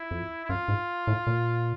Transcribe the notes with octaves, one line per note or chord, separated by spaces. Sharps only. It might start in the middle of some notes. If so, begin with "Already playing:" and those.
Already playing: E4
F2
E4
F#2 F4
G#2
A2
A#2